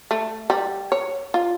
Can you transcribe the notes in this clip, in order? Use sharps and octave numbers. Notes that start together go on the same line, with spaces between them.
A3
G3
C#5
F4